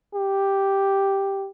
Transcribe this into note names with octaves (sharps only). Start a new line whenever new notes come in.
G4